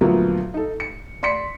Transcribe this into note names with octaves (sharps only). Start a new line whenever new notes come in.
D2 A#2 F3 F#3 A#3 B3
D#4 A4
C#7
D5 C6 B6 C#7